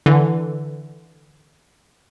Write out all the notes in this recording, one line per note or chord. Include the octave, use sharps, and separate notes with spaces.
D3 E3